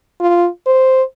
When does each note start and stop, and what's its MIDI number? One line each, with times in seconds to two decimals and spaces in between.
0.20 0.48 65
0.66 1.03 72